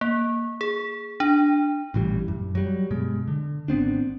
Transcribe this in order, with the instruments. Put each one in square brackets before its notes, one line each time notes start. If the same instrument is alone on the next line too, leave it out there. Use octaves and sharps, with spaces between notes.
[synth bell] A#3
G#4
D4
[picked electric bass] A1 A#2 E3 G3
F#2
F#3 G3
G2 B2 G#3
D3
G#1 B3 C4 D4